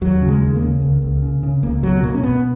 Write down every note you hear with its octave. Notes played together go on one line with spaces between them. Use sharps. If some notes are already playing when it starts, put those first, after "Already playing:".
D#2 F#3
C#3
G#3
D#2
A#3
C#3
C#2
C#2
C#3
C#3
C#2 A#3
B2 F#3
B2 A#3
C#4
B2 B3